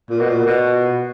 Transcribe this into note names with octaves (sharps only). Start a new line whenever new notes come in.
A#2
B2
A#2
B2